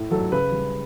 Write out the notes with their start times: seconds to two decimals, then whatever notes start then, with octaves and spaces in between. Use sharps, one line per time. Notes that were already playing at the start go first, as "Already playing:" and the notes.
Already playing: A2
0.11 F#3 A4
0.32 C#3 B4
0.52 G3